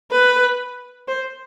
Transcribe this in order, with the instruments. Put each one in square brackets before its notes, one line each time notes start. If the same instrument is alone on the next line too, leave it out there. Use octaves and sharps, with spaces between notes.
[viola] B4
C5